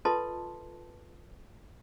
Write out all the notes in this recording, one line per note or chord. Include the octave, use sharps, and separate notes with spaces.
F4 A4 B4 D#5 A5 C6